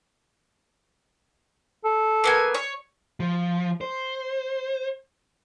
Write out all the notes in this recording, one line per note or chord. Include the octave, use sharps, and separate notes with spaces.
A4
A#3 B3 G#5
C#5
F3
C5